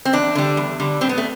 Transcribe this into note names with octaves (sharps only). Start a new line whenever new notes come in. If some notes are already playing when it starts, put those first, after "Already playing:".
C4
E2 D4
D3 G3
E2
D3 G3
A2 C4
B3
A3